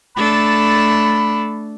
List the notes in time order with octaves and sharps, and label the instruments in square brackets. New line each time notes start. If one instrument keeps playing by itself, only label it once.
[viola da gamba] A3 D4 A4 [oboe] B5